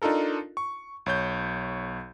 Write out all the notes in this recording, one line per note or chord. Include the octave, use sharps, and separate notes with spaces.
D4 D#4 F4 A4 A#4
C#6
B1 C#5 G6